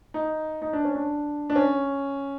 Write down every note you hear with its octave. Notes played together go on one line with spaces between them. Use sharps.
D#4
D#4
D4
C#4
D4
D4
C#4